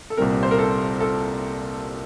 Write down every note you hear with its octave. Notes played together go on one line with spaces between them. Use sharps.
A4
C2 A#2 G3 C4 A#4
C5
A#4
A4
A4